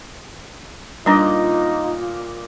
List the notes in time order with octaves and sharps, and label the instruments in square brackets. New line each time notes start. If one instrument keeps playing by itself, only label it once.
[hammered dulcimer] A#2 D#5 D6 [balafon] G3 D4 [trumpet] D#4 [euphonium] F4